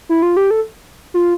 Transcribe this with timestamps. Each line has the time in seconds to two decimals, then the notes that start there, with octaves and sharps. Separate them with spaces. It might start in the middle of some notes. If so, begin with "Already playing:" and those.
0.09 E4
0.22 F4
0.37 G4
0.51 A4
1.14 F4